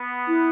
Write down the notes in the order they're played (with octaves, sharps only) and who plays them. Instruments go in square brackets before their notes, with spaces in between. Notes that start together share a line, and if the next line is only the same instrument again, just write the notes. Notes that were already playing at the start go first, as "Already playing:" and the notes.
Already playing: [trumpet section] B3
[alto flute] E4